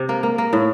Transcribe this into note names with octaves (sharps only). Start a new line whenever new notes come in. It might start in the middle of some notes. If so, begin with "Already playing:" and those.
Already playing: C3
A#3
A#3
A#3
A2